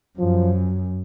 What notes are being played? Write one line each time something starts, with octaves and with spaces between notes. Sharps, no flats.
F#2 F3